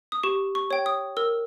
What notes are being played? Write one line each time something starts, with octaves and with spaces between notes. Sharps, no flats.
D#6
G4 C#6
C#6
C#5 G5
D#6
A#4 E6